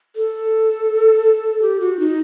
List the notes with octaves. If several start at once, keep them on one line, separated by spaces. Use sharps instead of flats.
A4
G4
F#4
D#4